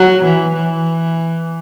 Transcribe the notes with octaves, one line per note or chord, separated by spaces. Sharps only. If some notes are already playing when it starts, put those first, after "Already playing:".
Already playing: F#3
E3
E3